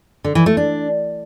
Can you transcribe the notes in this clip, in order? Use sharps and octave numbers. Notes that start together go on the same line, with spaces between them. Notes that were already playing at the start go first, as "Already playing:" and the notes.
D3
E3
A3
D4